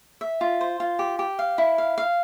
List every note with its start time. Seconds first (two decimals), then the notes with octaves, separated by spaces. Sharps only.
0.21 E5
0.41 F4
0.61 C5
0.80 F4
0.99 G4
1.19 G4
1.39 F5
1.58 E4
1.78 F5
1.98 F5